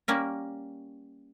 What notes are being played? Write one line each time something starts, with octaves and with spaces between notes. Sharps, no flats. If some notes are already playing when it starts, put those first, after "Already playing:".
G3 A#3 C#4 A#4